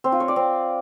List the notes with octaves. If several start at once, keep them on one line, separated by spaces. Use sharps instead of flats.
C4
F4
C#5
D5
C4